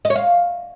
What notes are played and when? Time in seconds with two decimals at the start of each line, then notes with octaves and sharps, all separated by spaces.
0.05 D#5
0.10 C#5
0.16 F5